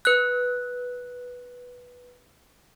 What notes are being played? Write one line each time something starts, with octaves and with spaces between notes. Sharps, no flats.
B4 F#6